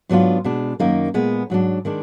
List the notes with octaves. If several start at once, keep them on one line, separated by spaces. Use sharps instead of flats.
G#2 F#3 B3 D4 F4
B2 G#3 D4
F#2 D#3 A#3 D#4
A#2 G#3 B3
G#2 F#3 D4
D#3 G#3 D4